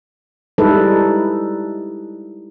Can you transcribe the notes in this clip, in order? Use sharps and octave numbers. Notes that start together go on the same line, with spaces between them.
G3 G#3 D#4 E4 A4 B4